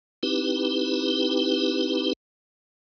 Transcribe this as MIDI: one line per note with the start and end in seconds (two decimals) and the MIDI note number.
0.23 2.13 60
0.23 2.13 63
0.23 2.13 64
0.23 2.13 67
0.23 2.13 71